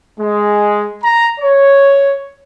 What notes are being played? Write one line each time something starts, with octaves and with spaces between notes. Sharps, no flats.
G#3
A#5
C#5